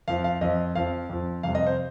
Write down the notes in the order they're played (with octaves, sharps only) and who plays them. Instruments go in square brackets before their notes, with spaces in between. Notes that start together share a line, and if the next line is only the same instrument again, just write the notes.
[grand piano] F2 F3 F5
F5
F2 F3 D#5
F2 F3 F5
F2 F3
F2 C3 G3 F5
D#5
C5